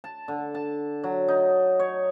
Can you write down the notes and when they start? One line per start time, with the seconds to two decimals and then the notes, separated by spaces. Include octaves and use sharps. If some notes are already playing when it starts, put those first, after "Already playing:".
0.04 A5
0.28 D3
0.55 A5
1.04 F#3
1.28 D#4
1.79 C#5